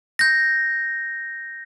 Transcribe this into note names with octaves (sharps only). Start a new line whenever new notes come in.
G6 A#6